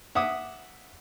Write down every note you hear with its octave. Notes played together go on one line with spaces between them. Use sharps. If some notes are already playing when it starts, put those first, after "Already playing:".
E5 F#5 D6 D#6